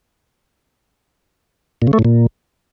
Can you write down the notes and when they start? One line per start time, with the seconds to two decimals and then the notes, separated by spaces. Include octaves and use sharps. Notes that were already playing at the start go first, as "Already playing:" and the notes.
1.82 A#2
1.87 C#3
1.93 A3
1.99 A2
2.05 A#2